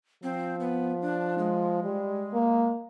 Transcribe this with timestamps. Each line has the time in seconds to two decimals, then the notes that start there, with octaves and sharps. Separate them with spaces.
0.23 F3 C4
0.60 B3
1.02 D4
1.38 G#3
1.84 G3
2.33 A#3